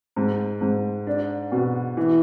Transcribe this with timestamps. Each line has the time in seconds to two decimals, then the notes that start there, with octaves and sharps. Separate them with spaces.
0.16 G#2
0.61 G#2
1.07 D4
1.52 B2
1.97 E3